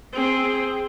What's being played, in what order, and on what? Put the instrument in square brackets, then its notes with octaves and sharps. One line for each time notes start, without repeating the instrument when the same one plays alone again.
[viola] C4 G#4